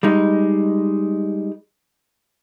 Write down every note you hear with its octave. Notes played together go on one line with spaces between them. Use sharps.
G3 G#3 D#4